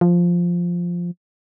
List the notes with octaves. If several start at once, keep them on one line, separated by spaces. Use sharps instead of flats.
F3